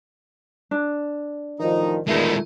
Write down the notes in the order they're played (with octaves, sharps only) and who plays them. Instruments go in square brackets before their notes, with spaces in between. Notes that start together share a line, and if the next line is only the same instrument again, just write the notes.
[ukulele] D4
[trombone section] A1 D#3 F3 [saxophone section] D#4
[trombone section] E2 A#2 [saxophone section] D#3 A3 [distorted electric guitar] G#3 E4